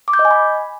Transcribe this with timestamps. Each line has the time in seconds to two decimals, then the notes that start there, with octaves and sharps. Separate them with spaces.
0.08 D6
0.13 G6
0.19 D#5
0.25 G#5
0.31 B5